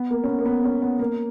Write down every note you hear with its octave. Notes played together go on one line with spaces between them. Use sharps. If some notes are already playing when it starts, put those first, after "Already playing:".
Already playing: B3
A#3
C#4
B3
A#3
B3
C#4
B3
A#3